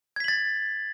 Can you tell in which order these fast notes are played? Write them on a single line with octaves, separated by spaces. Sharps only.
G#6 B6 F#7 A6